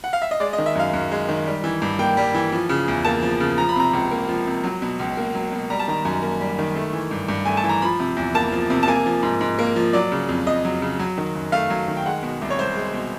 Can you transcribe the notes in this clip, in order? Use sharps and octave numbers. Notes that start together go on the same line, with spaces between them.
F#5
F5
E5
D#5
G#3 D5
D#5
D#3
E5
F#2 F5
F#2
G#3
D#3
G3
E3
G2
A#3 G5
G3
E3
F3
C#3
E2
A#3 A5
F3
C#3
F3 A#5
B5
C3 A#5
C#2
A#3
F3
C3
F#3
B2
C#2
A#3
F#3
B2
G3 A#5
A5
D#3 A#5
F#2
A#3
G3
D#3
A3
E3
G2
G2
A3 G#5
A5
E3
A#5
F3 B5
C3
E2
A#3 A5
F3
C3
A5
A#3 G#5
F3
G#2
G#2
A#3
F3
F#3 D5
C#3
F2
F2 D#5
F#3
C#3
F#3
D#3
F#2
A3 F5
F#3
D#3
G5
G#3 F#5
B2
C2
C#5
C2 C5
G#3
B2